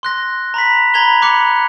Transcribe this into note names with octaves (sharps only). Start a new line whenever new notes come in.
C6 F#6 A#6
A#5 B5 B6
A#5 B5 G#6 F7 G7
B5 D6 F#6 C#7